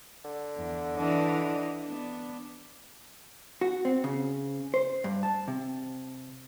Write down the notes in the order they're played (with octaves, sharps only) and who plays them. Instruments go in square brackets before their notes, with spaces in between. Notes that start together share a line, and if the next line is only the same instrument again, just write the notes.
[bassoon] D3
[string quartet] E2
E3 D4 D#5
B3 D4
[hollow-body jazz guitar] F#4
C4
C#3
C5
G2
A5
C3